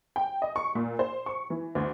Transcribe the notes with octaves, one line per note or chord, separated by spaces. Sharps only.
G5
D#5
C#6
A#2
C5
C#6
E3
D2